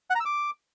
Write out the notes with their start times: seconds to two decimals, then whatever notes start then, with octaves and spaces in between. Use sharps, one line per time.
0.10 F#5
0.15 A#5
0.20 E6
0.25 D6